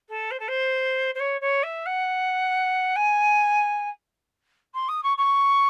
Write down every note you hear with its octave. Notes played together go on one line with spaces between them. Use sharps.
A4
C5
A4
C5
C5
C#5
C#5
E5
F#5
G#5
C6
D#6
C#6
C#6